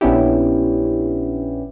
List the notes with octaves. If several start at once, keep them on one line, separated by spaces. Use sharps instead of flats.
A#1 B3 C#4 D4 E4 G4